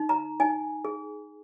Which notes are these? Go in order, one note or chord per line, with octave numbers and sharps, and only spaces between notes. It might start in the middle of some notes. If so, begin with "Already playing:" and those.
Already playing: D#4
A#5
D#4 G#5
G#4